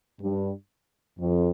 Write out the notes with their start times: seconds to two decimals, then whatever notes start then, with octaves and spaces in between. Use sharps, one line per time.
0.22 G2
1.20 F2